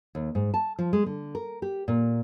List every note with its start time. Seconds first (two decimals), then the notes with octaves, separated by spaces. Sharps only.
0.15 D#2
0.35 G#2
0.54 A5
0.79 F3
0.93 G#3
1.06 D3
1.35 A#4
1.62 G4
1.88 A#2